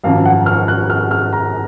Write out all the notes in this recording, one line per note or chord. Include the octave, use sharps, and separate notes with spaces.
G#1 F#2 F3 F5
F#5
F6
F#6
F6
F6
A#5